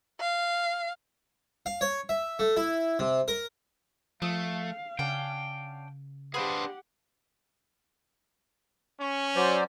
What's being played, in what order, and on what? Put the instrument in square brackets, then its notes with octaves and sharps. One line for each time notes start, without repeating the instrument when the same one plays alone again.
[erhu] F5
[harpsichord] F5
C#5
E5
A3
E4
C3
A#4
[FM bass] F3 [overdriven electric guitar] A3 [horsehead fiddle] F5 [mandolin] D#6
[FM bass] C#3 [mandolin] C#4 D4 F#5 [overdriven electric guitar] G5
[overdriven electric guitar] D4 G#4 [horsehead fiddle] G4 F#5 [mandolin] B4 C5 F5
[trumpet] C#4 [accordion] C#6
[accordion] F#3 C5 D5